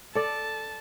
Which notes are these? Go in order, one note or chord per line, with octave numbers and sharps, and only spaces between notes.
A4 D5 A5